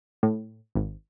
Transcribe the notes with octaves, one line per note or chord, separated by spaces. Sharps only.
A2
G#1